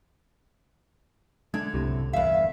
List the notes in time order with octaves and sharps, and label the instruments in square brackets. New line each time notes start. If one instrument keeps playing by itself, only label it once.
[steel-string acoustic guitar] D3 [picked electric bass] G#3 D4 [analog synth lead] G#6
[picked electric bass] F#1 A2 C4 [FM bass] C2 [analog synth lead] C3
[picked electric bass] G1 E2 [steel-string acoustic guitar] G2 E5 [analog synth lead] F5